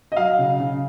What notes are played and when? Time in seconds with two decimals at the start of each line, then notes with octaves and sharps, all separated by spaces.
0.12 D#5
0.16 F#3 F5
0.38 C#3
0.60 C#3